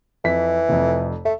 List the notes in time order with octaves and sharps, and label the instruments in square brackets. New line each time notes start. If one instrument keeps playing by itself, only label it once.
[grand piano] F2 B6 [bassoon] E3
[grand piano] F1 F2
[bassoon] A3 [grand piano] E5